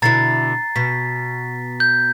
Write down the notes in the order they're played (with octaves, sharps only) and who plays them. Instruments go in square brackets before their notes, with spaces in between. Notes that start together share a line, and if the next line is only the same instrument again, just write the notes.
[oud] B2 D3 E4 [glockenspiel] A#5 A6 C7
[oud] B2 [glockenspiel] B6
[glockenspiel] G6